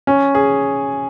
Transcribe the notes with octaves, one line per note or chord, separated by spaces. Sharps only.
C#4
G#4